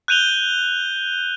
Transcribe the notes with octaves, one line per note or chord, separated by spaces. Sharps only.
F#6 G6 D#7 F7 G7